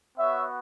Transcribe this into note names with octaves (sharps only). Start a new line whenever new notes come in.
B3 F#4 C#5 E5